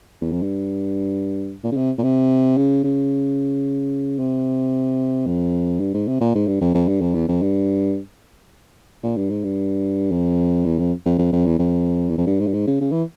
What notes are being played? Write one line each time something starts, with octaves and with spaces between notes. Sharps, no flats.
E2
F2
G2
A#2
C#3
C3
A#2
C3
C#3
C#3
C3
F2
G2
G#2
C3
A#2
G#2
G2
F2
F2
G2
F2
E2
F2
G2
A#2
G2
G#2
G2
F2
E2
F2
F2
F2
F2
E2
F2
E2
F2
G2
G#2
G2
G#2
C#3
C#3
E3